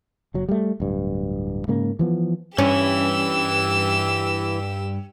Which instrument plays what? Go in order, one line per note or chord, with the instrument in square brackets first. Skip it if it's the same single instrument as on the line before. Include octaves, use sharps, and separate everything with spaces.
[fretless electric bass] F#1 F#3
G3 A3
D1 G2
G#2 C#3 A#3
E3 F3 B3
[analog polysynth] G2 [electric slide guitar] E3 E4 [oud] C#4 [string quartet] G4 E6